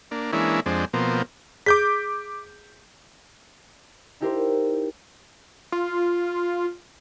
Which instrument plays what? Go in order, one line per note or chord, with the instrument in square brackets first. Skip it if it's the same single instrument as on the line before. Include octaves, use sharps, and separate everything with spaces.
[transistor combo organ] A#3 D4
E3 G#3 A#3 C#4 D4 E4
F2 G#3 C4 D4
B2 F3 A#3 C4
[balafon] G#4 [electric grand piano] D6 G6 B6
[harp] D#4 E4 G4 A#4 C5
[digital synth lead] F4